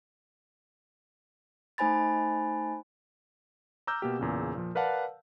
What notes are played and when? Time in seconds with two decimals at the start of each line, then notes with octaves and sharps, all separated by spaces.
1.78 A3 D#4 C5 G#5 B5 A6
3.87 A#5 D6 E6 F6 G6
4.02 B2 A#3 G4
4.19 E2 A#2 C#3
4.55 A#2 F3
4.75 A#4 B4 D5 F5 F#5 A5